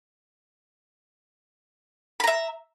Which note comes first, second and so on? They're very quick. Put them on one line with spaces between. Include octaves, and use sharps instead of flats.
B5 A#5 E5